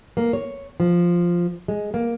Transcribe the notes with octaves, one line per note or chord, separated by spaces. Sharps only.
A#3
C#5
F3
G#3
A#3